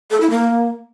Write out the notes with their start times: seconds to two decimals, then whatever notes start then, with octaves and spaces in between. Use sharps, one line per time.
0.11 A4
0.21 E4
0.30 A#3